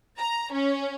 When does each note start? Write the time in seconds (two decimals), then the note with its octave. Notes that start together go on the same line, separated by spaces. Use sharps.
0.18 A#5
0.51 C#4